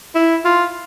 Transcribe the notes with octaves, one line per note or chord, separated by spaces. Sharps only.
E4
F4